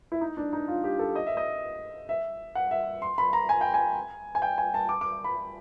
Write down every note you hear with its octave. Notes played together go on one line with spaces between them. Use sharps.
E4
D#4
D4
D#4
F4
G4
A4
D#5
E5
D#5
E5
F#5
E5
C6
B5
A#5
G#5
G5
G#5
G#5
G5
G#5
A5
D6
D6
B5